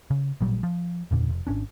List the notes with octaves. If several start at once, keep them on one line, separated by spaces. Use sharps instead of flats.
C#3
A1 A#2 F#3 G3
F3
F#1 E2 A#2 D3
F1
G#1 C#4 D4